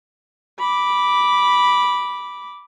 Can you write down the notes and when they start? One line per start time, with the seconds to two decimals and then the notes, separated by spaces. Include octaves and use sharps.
0.59 B5 D6